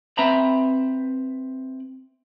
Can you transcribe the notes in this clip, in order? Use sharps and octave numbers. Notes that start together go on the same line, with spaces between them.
C4 B4 E5 A#5 B5